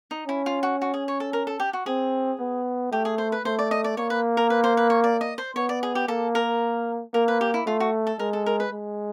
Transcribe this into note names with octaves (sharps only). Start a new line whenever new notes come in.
D#4
C#4 E4
F4
F#4
F#4
G#4
C#5
A4
A#4
A4
G4
F#4
C4 G#4
B3
A3 G4
G#4
C5
B4
A3 C5
D5
D#5
D5
A#3 C#5
B4
A#4
B4
C5
B4
C#5
D5
D#5
C5
B3 C#5
D5
G#4
G4
A#3 A4
A#4
A#3 A#4
B4
G4
E4
A3 F4
F#4
A4
G#3 A#4
A4
A#4
B4
G#3